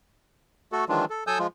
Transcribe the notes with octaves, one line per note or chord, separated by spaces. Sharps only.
A3 F#4 A4
D#3 E3 F#3 G#3 D4 F4
A4
F#3 A4 G#5 D#6 E6 G6
F3 G#3 F4